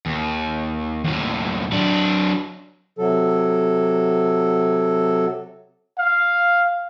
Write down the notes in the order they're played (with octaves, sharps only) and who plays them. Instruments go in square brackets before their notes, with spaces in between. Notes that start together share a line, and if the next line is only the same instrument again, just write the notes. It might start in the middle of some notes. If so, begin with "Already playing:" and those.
[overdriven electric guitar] D#2
D#2 A2
F#3 D4
[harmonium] C3 F#3 A4
[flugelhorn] F5